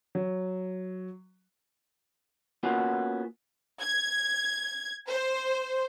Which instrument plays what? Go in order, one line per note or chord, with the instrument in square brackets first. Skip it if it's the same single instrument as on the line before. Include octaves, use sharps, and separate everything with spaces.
[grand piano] F#3
[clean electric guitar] A#3 B3 C#4 F4 F#4
[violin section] G#6
C5